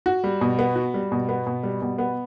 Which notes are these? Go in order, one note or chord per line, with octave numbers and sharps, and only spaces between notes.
F#4
G3
B2
B3
F#4
G3
B2
B3
B2
G3
B2
B3